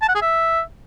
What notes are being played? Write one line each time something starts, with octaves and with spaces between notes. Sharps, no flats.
A5
F#5
G#4
E5